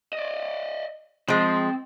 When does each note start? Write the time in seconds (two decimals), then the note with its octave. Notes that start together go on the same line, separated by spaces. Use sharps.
0.13 D5 D#5
1.28 F3 G#3 C4